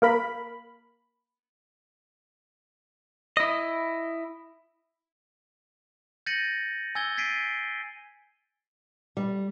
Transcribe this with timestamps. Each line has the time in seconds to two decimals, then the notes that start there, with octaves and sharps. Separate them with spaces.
0.02 A#3 A#4 B5
3.37 E4 D#5
6.26 G6 A6 A#6 C#7 D#7 F#7
6.95 G#5 E6 G#6 A6 G7
7.17 G#6 A6 B6 C7 D7 D#7
9.17 G3